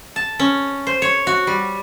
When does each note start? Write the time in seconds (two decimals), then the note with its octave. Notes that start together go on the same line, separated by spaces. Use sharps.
0.16 A5
0.39 C#4
0.87 C5
1.02 C#5
1.27 F#4
1.47 G3